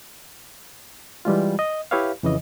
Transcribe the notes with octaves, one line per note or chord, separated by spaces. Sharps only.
E3 G3 G#3 F4
D#5
E4 G4 B4 C#5 E5 F5
F2 C#3 E3 D#5